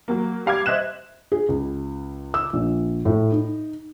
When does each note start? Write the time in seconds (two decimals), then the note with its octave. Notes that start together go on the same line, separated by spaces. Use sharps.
0.08 F#3 A#3
0.46 G3 F5 D6 G#6
0.66 C5 D#5 E5 F#6 E7
1.32 G#4
1.49 C#2
2.34 E6
2.53 A#1
3.05 A2
3.32 D#4